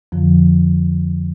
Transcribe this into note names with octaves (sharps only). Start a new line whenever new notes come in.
F2 D3 F3